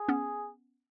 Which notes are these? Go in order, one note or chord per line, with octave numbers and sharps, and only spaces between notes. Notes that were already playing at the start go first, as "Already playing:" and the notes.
Already playing: G#4
B3 C#4